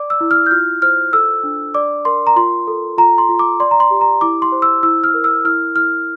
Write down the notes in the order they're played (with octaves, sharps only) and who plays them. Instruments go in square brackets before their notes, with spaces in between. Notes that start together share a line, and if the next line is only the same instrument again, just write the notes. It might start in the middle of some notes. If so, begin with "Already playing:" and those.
Already playing: [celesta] D5 D6
E6
E4
F6
G6
F4 F6
C5 F6
A4 E6
D4
D5 D6
A#4 C6
A#5
F4 C6
A4
F4 A#5
C6
F4
D6
D5 C6
A#5
C6
G4
A#5
E4 D6
C6
C5
E6
E4 E6
F6
A#4
E6
E4 F6
E4 F6